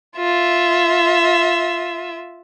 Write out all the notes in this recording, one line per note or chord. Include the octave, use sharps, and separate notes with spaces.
F4 E5